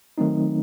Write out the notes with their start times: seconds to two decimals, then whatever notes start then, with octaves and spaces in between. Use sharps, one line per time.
0.18 D#3 F#3 A3 C4 D#4